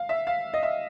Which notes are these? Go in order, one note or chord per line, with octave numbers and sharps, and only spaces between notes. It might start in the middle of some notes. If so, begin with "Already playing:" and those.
Already playing: F5
E5
F5
D#5
E5